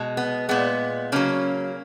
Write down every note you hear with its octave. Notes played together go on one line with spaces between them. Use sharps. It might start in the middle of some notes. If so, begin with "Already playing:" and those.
Already playing: B2 G#3
B3
A#2 G#3 B3
C#3 F#3 A#3 C#4